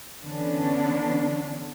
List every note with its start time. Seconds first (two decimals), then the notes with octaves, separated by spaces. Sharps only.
0.24 D3 E3 B3 C#4 D4